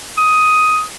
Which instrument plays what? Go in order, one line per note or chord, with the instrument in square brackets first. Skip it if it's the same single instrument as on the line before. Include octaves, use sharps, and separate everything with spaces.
[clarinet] D#6